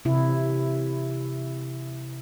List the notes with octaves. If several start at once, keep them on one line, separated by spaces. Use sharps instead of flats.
C3 E4